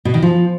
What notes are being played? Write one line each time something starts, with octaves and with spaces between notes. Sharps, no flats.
B2
D#3
F3